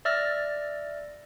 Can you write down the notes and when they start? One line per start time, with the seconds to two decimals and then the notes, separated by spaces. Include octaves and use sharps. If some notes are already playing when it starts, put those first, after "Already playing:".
0.05 D5 E5 E6 F6 A6 A#6